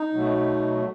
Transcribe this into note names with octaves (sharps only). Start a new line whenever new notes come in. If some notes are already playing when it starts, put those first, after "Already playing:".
Already playing: D#4
B2 F#3 A3